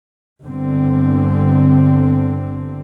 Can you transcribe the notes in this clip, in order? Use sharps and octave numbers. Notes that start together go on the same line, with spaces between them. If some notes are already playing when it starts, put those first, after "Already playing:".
G1 G2 D3 C4